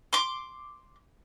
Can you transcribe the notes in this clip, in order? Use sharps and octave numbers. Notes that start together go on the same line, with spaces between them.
C6 D6